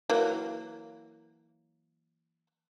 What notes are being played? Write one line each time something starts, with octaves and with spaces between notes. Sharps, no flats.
E3 F#3 A#3